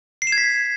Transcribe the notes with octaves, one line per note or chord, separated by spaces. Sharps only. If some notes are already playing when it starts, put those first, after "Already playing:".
C7
E7
G#6
B6